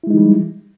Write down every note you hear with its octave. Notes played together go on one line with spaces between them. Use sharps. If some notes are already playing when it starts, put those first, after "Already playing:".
E3 G3 G#3 D#4 E4